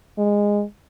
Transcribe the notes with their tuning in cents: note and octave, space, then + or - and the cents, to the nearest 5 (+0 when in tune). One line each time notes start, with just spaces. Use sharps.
G#3 -15